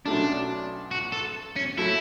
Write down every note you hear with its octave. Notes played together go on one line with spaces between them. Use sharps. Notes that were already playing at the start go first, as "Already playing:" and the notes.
B1 B2 A3 C#4 D4
F#4
A4
C#4
F#3 A3 E4